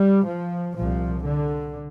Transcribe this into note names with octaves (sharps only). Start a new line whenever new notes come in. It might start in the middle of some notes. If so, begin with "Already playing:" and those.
Already playing: G3
F3
C2 A#2 F3
D3